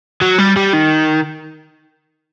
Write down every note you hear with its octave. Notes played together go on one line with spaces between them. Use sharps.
F#3
G3
G3
D#3